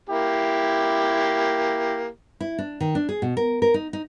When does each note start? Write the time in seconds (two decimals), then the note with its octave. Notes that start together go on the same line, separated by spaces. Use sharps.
0.09 A#3 E4 G4
2.41 E4
2.58 D4
2.81 D#3
2.95 D4
3.09 G#4
3.22 B2
3.37 A#4
3.62 A#4
3.74 D#4
3.93 D#4